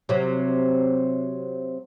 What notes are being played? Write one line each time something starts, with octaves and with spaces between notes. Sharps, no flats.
C3 F#3